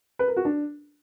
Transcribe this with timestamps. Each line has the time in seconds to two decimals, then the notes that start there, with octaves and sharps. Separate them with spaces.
0.19 B4
0.28 A#4
0.36 F#4
0.45 D4